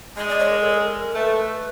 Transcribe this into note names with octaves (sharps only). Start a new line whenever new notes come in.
G#3 D#5
D5
C#5
A#4
A4
A#4
A#4
A3 B4